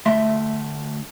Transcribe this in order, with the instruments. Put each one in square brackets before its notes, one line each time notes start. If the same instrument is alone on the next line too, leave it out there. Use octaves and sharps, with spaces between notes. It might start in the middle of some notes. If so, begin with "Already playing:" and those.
[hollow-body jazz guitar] D2 A3 E5 C6